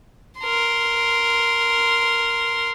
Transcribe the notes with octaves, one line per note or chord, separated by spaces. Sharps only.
A#4 C6